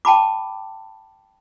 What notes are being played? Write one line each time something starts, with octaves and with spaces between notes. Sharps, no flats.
G5 A5 B5 D6